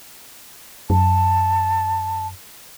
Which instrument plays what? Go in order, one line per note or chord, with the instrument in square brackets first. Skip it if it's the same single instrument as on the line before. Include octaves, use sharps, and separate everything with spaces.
[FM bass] F#2 [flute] A5